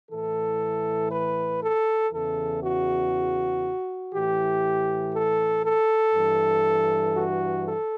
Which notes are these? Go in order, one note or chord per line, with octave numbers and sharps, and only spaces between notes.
A2 E3 A4
B4
A4
E2 C#3 E3 A4
F#4
A2 E3 G4
A4
A4
G2 E3
F#4
A4